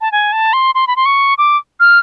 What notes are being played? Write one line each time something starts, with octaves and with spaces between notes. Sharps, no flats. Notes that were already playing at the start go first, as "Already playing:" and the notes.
A5
G#5
A5
C6
C6
B5
C6
C#6
D6
F6